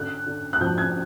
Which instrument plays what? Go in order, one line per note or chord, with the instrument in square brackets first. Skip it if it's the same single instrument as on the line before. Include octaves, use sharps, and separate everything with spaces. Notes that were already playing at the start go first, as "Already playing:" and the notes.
Already playing: [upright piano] D3 F#6
D3
F#6
F3 G6
G#6